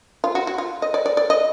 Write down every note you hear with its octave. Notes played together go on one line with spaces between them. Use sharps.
F4
F#4
F#4
F4
D#5
D5
D5
D5
D#5